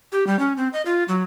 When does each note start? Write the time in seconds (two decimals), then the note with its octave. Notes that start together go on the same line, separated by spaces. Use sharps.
0.12 G4
0.27 G3
0.39 C#4
0.57 C4
0.73 D#5
0.86 F4
1.08 F#3